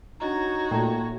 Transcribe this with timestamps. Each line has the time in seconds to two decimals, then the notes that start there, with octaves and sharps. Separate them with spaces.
0.20 D4 D#4 F#4 C#5 D#5 A#5
0.71 A#2 A3 G5 A#5